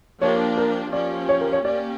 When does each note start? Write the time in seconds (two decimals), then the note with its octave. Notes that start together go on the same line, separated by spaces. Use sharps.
0.21 F3 A#3 D4 G4 C#5
0.57 A#4
0.93 F3 C#4 G4 D5
1.29 C#5
1.41 A#4
1.53 C#5
1.65 A#3 C#4 G4 D5